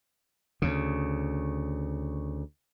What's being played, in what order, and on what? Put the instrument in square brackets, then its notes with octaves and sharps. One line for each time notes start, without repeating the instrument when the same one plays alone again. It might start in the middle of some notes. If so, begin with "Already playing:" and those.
[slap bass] D2 C#3